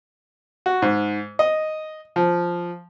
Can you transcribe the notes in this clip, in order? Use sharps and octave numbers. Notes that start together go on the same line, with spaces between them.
F#4
G#2
D#5
F3